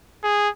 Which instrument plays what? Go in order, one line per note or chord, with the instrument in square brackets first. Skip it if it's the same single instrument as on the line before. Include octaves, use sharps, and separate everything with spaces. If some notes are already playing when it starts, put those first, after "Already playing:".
[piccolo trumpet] G#4